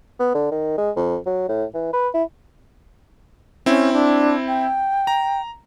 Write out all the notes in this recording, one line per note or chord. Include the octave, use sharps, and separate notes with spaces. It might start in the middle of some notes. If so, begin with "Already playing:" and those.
B3
D3
D#3
G#3
F2
F#3
A2
E3
B4
E4
C4 C#4 E4
D4
G5
A#5